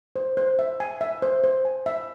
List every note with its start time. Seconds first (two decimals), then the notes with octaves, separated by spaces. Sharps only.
0.16 C5
0.37 C5
0.59 E5
0.80 G#5
1.01 E5
1.22 C5
1.44 C5
1.65 G#5
1.86 E5